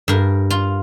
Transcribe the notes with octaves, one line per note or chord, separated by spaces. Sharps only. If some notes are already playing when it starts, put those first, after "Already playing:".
G2 A#4
F4